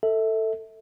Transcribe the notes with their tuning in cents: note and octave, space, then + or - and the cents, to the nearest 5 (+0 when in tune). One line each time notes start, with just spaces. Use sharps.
A4 +15 E5 -30